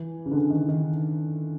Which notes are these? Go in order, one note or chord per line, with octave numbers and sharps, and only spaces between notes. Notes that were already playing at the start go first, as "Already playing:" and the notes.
Already playing: E3
C#3
D3
D#3
D#3